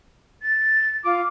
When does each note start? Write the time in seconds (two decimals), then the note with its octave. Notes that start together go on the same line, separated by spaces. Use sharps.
0.42 A6
1.05 F4 D6